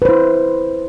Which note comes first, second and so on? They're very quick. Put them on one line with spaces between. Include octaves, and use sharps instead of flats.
B4 C5 E4